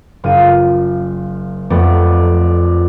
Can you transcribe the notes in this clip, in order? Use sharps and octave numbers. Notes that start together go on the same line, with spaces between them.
F#1 F4 D#7
F2 A3 B3 D5